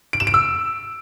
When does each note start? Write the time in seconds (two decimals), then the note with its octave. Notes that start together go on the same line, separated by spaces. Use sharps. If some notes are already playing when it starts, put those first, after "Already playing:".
0.13 D7
0.20 E7
0.27 D7
0.34 E6